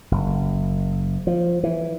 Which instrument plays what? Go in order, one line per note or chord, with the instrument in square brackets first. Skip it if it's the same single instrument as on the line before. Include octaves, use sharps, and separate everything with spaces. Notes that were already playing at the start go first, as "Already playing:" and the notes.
[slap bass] F#1
F3
E3